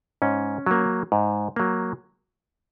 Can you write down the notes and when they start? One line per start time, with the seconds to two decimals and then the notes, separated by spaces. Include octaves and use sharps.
0.22 G#2 C#4
0.66 F#3 A#3
1.12 G#2
1.56 F#3 A#3